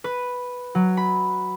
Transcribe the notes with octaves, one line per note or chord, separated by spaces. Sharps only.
B4
F#3
B5